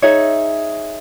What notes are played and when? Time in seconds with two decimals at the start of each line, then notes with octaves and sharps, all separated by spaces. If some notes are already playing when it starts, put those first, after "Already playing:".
0.02 D#4 G#4 C#5 E5